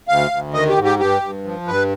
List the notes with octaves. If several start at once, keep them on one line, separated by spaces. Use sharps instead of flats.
D2 F5
D2
D#3 D#5
G4
G#2
G4
G2 G4
G2
F3
G2 B4